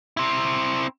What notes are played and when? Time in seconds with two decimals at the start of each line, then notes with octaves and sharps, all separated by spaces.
0.17 C4 E4